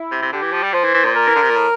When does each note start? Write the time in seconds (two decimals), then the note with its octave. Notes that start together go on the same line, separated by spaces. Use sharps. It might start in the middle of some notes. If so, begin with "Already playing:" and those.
Already playing: E4
0.12 C3
0.22 C3
0.32 D3 G4
0.42 E3
0.53 F3
0.63 G3
0.73 F3 C5
0.84 E3
0.94 E3
1.04 A#2
1.15 A#4
1.28 E3
1.35 D3
1.42 C3
1.50 A#2
1.56 A2